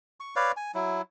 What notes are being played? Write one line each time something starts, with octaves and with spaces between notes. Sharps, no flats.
C#6
B4 C#5 D5 F5
G#5
F#3 E4